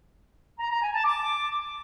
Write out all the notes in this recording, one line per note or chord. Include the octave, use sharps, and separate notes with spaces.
A#5
A#5
G#5
A5
D6